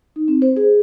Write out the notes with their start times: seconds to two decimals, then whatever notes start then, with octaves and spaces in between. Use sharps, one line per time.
0.16 D#4
0.28 C4
0.42 C5
0.56 G#4